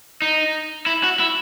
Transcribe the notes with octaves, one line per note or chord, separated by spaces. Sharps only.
D#4
E4
F#4
E4